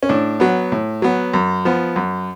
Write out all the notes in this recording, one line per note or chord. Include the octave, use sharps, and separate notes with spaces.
C#4
A2 D4
F#3 B3
A2
F#3 B3
F#2
F3 B3
F#2